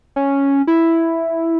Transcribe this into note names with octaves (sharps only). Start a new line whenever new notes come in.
C#4
E4